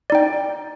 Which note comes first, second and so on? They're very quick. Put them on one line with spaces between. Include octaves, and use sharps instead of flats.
D5 D#4 G5